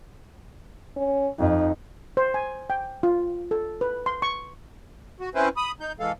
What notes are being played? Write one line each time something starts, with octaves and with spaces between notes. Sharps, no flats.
C#4
F2 D#4
C5
G#5
G5
F4
A4
B4
C6
C#6
F#4
C4 C#4 E4 B4 C5
B5 D#6
D#4 G6
E3 G#3 A4 F5